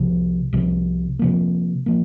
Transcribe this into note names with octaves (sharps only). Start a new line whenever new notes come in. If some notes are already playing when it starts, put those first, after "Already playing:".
Already playing: C2 C3 F3
C2 C3 F3
C3 F3 A#3
F3 A#3